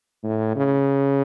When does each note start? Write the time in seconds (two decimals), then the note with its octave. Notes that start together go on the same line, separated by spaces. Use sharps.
0.24 A2
0.55 C#3